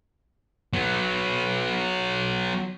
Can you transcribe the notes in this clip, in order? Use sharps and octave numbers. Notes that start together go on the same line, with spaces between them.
F#3 B3